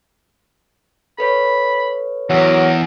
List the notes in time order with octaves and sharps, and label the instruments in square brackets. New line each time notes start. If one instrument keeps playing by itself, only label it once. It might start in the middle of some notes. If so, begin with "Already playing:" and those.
[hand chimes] A4 B4 C#5 [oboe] B5
[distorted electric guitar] E2 [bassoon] F#3 [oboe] A#4